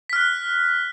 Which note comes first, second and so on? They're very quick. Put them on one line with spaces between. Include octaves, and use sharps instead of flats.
B6 F6 F#6